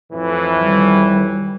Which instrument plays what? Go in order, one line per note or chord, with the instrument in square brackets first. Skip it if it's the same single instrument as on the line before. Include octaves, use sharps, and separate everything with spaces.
[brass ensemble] F2 A2 E3
[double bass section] D#3 G3